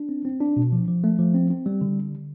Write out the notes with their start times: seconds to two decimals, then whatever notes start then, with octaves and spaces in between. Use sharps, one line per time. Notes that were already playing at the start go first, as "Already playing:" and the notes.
Already playing: D4
0.09 C4
0.25 C4
0.41 D4
0.57 B2
0.72 F3
0.88 F3
1.04 A3
1.19 F3
1.34 C4
1.50 C4
1.66 G3
1.81 D3